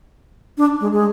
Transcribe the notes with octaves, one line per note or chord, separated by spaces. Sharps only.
D4
G#3
G#3